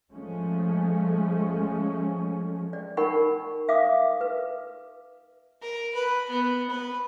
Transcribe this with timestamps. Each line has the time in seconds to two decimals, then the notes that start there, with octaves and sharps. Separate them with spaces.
0.12 F3 G#3 A3 C#4
2.73 D5
2.97 D#4 A#4 F#5 B5 C#6
3.69 E5 F5 D6 D#6
4.21 B4
5.62 A#4
5.94 B4
6.29 B3
6.70 B4